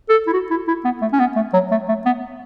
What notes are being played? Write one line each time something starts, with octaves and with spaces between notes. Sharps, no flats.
A4
E4
F#4
E4
E4
B3
A3
C#4
B3
A3
F#3
A3
A3
B3